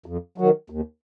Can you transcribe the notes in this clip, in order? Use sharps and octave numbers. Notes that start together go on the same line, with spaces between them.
F2
D#3 F#3
D#2